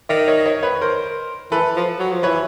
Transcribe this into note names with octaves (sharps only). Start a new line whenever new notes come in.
D#3 D5 E5
C#5 D#5
C#5 D#5
B4 C#5
A#4 C5
E3 A4 B4
F3
F#3
F3
E3 B4 C#5